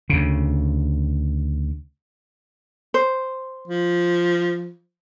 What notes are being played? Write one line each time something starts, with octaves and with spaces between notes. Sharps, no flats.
D2 C#3
C5
F3